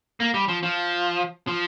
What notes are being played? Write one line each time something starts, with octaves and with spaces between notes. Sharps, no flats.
A#3
G3
F3
F3
F3